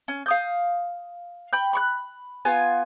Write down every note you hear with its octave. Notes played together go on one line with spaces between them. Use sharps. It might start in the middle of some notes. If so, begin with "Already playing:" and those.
C#4
F5 D#6 G6
G5 B5 G6
B5 C#6 F#6
B3 F4 G#5